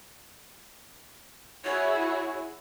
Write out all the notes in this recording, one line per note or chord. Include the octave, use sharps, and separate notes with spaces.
E4 F#4 G#4 C#5